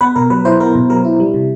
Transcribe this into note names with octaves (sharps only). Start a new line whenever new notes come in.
B3 B4
B2 A#4
F#3 B4
E4 C5
B3 A#4
B2
F#3 A#4
E4
G3
C3